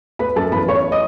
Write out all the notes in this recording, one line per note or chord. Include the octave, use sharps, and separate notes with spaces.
A3 B4 B5
F#2 A4 A5
E3 B4 B5
A3 C#5 C#6
D#5 D#6